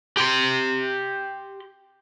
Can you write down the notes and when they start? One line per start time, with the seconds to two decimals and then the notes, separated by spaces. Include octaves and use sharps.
0.17 G4 C6